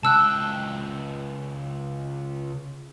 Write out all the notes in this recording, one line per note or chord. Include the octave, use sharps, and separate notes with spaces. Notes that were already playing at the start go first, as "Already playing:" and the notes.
C#2 G5 A5 E6 F#6